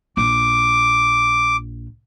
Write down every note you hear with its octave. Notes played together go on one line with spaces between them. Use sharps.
A#1 D6